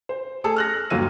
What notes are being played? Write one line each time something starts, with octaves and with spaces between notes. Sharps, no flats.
C5
A3 G#4 A4
F6 F#6 A#6
G1 D#2 F#3 F4 E6 D#7